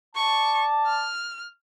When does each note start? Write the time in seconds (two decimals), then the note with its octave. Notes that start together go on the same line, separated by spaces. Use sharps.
0.15 D5 A5 C#6
0.87 F6